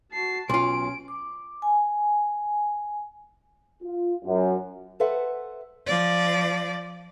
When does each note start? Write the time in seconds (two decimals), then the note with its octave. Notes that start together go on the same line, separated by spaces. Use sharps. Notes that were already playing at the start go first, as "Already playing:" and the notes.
0.12 F#4 A5 C7
0.49 B1 C#4 F4 C6 D7
1.08 D6
1.62 G#5
3.83 F4
4.25 F#2
5.00 A4 B4 C5 E5 F#5
5.87 F3 D5